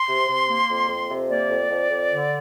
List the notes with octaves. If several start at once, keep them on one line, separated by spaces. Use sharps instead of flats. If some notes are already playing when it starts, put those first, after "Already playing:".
Already playing: C6
C3
C3
A#3
F2
F2
C3
A#3 D5
F2
F2
F2
D3